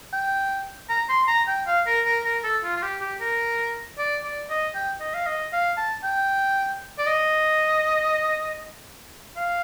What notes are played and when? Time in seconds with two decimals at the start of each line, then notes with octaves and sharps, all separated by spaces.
0.13 G5
0.90 A#5
1.09 C6
1.28 A#5
1.48 G5
1.67 F5
1.87 A#4
2.05 A#4
2.24 A#4
2.44 A4
2.64 F4
2.77 F4
2.83 G4
3.01 G4
3.21 A#4
3.98 D5
4.24 D5
4.50 D#5
4.75 G5
5.01 D#5
5.14 F5
5.27 D#5
5.53 F5
5.77 A5
6.04 G5
6.99 D5
7.07 D#5
9.37 F5